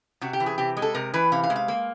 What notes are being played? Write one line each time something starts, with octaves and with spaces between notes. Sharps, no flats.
C3 F#4
G4
E3
G#4
C3 G4
G#3
A4
C3 A#4
E3 B4
C3 F5
F5
G#3
F5
A#3